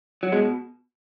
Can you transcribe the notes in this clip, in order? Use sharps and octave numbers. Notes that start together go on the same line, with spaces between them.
F#3
B2 G#3